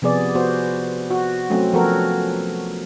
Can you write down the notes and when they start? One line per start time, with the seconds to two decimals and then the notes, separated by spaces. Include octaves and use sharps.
0.02 C3 F3 B3 G#4 D5
0.35 B3 F#4 C5
1.11 F#4
1.50 F#3 A3 C4 C#4
1.73 F3 B3 F#4 A4 A#4 C#5